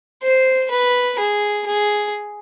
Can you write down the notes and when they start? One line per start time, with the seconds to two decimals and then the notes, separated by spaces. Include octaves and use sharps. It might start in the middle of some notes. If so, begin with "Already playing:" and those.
0.22 C5
0.70 B4
1.18 G#4
1.66 G#4